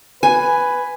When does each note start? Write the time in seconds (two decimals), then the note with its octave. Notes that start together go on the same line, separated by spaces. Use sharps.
0.23 B4 G#5